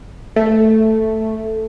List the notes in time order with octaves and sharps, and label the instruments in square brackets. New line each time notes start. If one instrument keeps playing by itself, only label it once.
[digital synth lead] A3